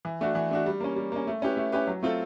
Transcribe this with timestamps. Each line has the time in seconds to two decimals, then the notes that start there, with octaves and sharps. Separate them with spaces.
0.05 E3
0.21 A3 D4 F#4
0.35 E3
0.51 A3 D4 F#4
0.66 G3
0.80 A#3 C#4
0.96 G3
1.12 A#3 C#4
1.27 A3
1.42 C#4 E4 G4 B4
1.57 A3
1.72 C#4 E4 G4 B4
1.87 F#3
2.03 A3 C4 F4 A4